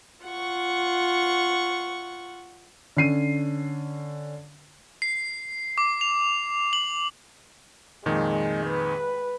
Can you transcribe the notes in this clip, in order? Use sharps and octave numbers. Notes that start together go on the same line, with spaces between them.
F4 F#5 C#6
D3 C#4 C7 D#7
C7
D6
F7
F#7
F2 A#2 D#3 G#3
B4